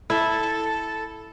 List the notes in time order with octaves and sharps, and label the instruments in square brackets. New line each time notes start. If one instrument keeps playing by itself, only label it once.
[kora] E4 [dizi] A4